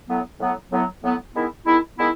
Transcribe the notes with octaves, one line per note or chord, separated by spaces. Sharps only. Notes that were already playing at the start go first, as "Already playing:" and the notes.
A2 F#3 B3
A2 F#3 B3
A2 F#3 B3
A2 F#3 B3
D#3 G#3 B3 E4
D#3 G#3 B3 E4
D#3 G#3 B3 E4